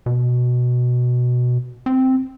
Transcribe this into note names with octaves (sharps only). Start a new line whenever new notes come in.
B2
C4